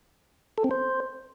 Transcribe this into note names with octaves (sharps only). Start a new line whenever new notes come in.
A4
C4
C5